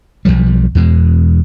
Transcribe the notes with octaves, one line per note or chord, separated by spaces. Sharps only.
B1 F2 F3 G3
E2 B2 G#3